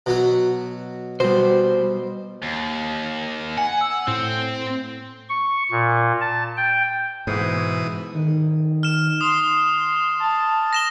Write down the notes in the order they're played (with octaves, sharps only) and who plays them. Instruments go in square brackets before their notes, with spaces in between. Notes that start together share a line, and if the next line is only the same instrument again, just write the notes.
[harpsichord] B2 F#3 F#4
[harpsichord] B2 [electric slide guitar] G3 C5
[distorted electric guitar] D#2
[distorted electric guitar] F#5 [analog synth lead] G#5
[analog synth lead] E6
[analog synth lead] A2 [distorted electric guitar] C4
[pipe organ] C#6
A#2
A5
G5
[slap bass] G#2 [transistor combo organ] B2 E3 D#6
[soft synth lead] D#3
[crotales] F6 E7
[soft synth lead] C6 [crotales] D#6
[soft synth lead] A5
[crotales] A#6 E7 G7